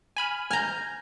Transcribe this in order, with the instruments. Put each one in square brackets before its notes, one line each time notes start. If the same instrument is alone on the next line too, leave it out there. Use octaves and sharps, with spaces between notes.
[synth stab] G#5 B5 F6
[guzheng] G#5 A#5 [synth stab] F6 G6